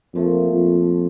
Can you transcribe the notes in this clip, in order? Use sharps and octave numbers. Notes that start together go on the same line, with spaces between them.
F2 A#2 F3 A3
F2